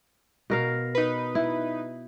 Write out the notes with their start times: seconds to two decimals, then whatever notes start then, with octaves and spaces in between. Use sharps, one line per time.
0.50 B2 A#4 F5
0.95 D#4 B4
1.35 E4